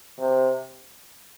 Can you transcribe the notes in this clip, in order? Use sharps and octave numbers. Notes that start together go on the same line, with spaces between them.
C3